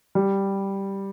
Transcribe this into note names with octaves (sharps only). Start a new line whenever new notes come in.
G3